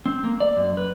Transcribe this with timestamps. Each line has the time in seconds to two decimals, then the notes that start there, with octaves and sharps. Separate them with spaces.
0.06 C4
0.24 A#3
0.40 D5
0.57 F#2
0.77 B4